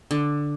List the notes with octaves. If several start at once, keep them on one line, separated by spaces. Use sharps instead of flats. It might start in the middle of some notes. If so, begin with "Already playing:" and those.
D3